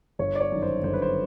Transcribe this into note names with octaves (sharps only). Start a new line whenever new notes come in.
G1 C#5
D5
C#5
F#2 D#3
C5
G1 C5
B4
C5